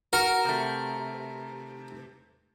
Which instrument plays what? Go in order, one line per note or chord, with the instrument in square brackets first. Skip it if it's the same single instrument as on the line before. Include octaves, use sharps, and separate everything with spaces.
[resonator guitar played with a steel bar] F#4 [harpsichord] A#4
[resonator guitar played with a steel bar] C3 A3